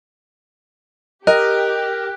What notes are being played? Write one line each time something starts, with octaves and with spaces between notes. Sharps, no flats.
G4 A#4 D#5 F#6